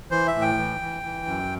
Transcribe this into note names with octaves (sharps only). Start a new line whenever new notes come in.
E3 C5
E5
A2
G5
E3
E3
E3
F#2